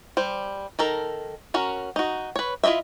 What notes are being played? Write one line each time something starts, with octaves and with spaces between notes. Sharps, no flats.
G3 C5
D#3 A4 A#4
C#4 F#4 A#4
D#4 F#4
B4 C#5
E4 F4 C5 D#5 E5